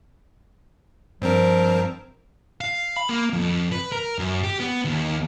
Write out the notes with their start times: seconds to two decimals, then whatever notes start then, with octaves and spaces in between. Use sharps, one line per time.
1.22 G2 F3 C4 A#4
2.61 F5
2.96 B5
3.09 A#3
3.33 F2
3.72 B4
3.92 A#4
4.19 F#2
4.43 G4
4.60 B3
4.85 D#2